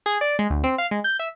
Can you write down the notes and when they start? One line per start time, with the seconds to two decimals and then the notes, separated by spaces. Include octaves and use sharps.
0.06 G#4
0.21 D5
0.39 G#3
0.50 D2
0.64 C4
0.78 F5
0.91 G#3
1.04 G6
1.19 E5